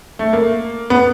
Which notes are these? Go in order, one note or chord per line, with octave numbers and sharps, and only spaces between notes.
A3
A#3
B3